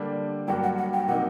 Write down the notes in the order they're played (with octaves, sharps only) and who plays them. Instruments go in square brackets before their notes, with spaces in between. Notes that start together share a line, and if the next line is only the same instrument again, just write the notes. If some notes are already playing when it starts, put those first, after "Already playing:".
Already playing: [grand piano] D3 G3 A#3 D4
[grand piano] G2 F#3 A#3 F#4 [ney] G5
[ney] F#5
F#5
G5
[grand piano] C3 F#3 A#3 D#4 [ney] F#5